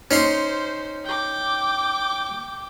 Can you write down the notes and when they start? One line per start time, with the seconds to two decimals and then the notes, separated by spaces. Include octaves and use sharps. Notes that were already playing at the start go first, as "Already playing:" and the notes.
0.11 C#4 D#4 C5 C6
1.05 G5 D6